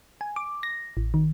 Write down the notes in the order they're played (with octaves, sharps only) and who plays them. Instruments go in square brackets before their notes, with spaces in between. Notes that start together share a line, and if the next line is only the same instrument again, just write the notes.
[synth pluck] G#5
D6
A#6
A1
D#3